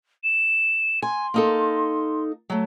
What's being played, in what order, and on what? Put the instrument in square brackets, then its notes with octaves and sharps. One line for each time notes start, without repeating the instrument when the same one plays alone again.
[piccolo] E7
[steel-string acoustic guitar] G#5 [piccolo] C6
[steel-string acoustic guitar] A#3 D#4 A4
F#3 A3